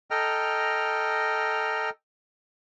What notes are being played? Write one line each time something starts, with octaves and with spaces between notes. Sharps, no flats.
A4 D#5 G5 A#5 F6